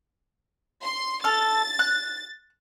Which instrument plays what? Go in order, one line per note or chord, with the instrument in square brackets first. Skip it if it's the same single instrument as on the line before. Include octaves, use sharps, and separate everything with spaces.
[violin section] C6
[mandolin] A4 F6 [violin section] A6
[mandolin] F#6